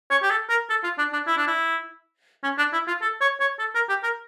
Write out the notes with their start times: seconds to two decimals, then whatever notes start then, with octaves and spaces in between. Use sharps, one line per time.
0.11 C#5
0.22 G4
0.30 A4
0.49 A#4
0.69 A4
0.83 F4
0.98 D4
1.13 D4
1.27 E4
1.37 D4
1.47 E4
2.43 C#4
2.58 D4
2.73 E4
2.87 F4
3.01 A4
3.21 C#5
3.40 C#5
3.59 A4
3.74 A#4
3.89 G4
4.03 A#4